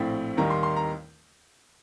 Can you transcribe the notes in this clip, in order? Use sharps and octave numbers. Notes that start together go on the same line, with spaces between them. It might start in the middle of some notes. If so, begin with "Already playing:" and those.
Already playing: A#1 A2 A3 C4 G5
D#2 D#3 G3 A#5
C6
C6
A#5